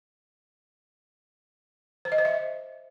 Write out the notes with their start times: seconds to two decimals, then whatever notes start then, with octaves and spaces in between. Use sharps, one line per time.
2.05 C5
2.12 D#5
2.18 C5
2.25 E5